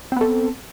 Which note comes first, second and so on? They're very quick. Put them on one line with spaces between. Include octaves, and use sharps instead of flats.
C4 B3 A4